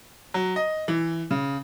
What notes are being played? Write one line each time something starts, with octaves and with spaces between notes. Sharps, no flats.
F#3
D#5
E3
C#3